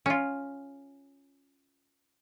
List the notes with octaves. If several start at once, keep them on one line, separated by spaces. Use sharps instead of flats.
C#4 F4